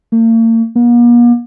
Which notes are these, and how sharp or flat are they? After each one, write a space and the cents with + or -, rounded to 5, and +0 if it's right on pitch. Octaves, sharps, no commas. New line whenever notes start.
A#3 -45
A#3 +45